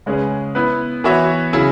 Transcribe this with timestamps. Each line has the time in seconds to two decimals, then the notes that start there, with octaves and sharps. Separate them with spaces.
0.06 C#3 G#3 C#4 G#4 B4
0.55 B3 E4 B4
1.04 E3 B3 F#4 C#5 E5
1.53 C#3 F#3 E4 G#4